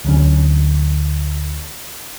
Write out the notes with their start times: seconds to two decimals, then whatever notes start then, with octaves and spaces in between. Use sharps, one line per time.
0.05 D2 F#3 C#4